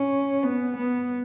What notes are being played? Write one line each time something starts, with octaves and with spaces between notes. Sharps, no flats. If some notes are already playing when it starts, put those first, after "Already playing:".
Already playing: C#4
B3
B3